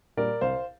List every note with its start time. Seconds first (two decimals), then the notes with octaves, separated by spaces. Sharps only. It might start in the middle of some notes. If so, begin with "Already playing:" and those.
0.17 A#2 G3 A#4 D5
0.41 C2 C5 F5